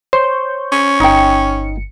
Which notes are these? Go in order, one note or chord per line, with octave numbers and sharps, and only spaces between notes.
C5 C#5 C#6 G6
C#4
G1 D#4 G5 C#7